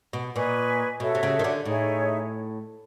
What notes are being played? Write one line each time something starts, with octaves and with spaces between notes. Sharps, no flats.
B2
A#2 B4 D#5 G#5 C#6
B2 F#4 A4 C#5 E5
C3
C#3
D#3
D3
A2 D#4 G#4 C#5 E5